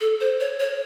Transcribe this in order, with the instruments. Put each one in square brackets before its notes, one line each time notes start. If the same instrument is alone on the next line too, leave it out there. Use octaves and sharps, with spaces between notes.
[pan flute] A4
C5
C#5
C#5